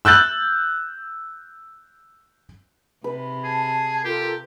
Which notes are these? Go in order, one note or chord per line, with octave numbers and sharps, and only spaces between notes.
E6 F#6 G6 A6 F#7
C3 B4
G#4 A5
F4 G4 A4 A#4